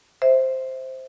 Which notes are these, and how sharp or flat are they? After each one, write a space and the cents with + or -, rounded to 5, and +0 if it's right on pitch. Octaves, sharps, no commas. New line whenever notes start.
C5 +0 E5 -20